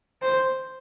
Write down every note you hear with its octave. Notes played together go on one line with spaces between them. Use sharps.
C5